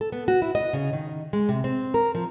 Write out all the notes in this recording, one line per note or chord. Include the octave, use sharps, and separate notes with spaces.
A4
B3
F#4
E4
D#5
C#3
D#3
G#3
C3
C4
A#4
F3